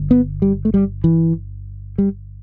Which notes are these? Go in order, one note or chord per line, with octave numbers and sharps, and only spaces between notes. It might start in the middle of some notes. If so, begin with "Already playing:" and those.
Already playing: G1 G2 D3
B3
G3
A3
G3
E3
G3